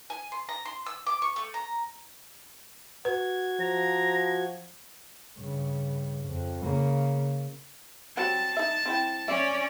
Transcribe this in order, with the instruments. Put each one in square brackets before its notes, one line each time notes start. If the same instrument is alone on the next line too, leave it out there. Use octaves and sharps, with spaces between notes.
[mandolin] G#5
C6
A#5
C6
E6
D6
C#6
A3
A#5
[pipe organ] F#4 G#6 [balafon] B4
[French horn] F3 [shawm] A#5
[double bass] G2 C#3
F2
C#3 A#3
[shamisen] F#3 G3 C4 [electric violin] A5
[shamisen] D#4 E5
C4 E4 G5
[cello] C#4 D5 [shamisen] E5